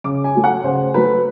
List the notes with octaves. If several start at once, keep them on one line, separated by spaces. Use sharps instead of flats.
C#3 D6
G#5
F#3 A3
F#5
C#3 C5
F#3 A3 B4